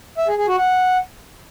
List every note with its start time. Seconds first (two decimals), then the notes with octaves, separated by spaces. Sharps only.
0.18 E5
0.28 G#4
0.38 G#4
0.48 F#4
0.58 F#5